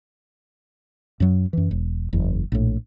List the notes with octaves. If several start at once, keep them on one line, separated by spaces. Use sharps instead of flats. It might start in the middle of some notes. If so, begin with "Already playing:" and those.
F#2 F#3
F#2 E3
E1
F#1 E2
A#1 A2